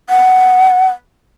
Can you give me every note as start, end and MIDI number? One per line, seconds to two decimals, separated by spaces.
0.10 0.87 78